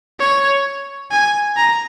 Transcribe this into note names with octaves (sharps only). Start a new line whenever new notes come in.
C#5
G#5
A#5